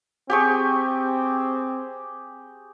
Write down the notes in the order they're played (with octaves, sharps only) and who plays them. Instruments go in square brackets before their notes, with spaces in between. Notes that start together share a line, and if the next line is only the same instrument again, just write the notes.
[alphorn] C4 [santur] G4 G#4 C#6